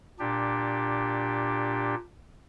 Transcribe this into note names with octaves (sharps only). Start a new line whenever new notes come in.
A#2 D4 G4